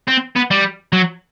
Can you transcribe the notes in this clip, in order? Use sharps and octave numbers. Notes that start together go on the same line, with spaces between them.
C4
B3
G3
F#3